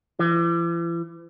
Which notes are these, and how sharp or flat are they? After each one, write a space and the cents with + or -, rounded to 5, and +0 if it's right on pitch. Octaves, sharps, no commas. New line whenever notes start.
E3 +40